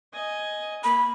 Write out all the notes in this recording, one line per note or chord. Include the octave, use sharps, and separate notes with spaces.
D#5 G#5
A#3 B5